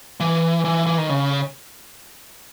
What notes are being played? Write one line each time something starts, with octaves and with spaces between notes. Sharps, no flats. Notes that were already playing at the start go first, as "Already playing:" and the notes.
E3
E3
E3
D#3
C#3